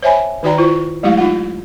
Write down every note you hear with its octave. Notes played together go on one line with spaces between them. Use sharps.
C5 C#5 E5 G5 G#5 B5
D#3 D#4 F#4 D5 G5 A#5
E4 F4 C5
F#3 G#3 A3 E4 G4 F5
D#4 F4 F#5